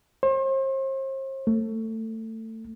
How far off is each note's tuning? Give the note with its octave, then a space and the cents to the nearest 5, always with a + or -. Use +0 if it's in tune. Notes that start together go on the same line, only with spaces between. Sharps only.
C5 +40
A3 +20